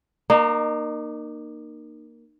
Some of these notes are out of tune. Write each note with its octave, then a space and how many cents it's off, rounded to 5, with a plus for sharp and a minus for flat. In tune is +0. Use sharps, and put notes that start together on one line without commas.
A#3 +5 D#4 -35